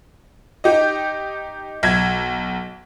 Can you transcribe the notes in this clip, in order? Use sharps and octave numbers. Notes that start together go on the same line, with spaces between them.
D#4 G4 D#5
B1 G#6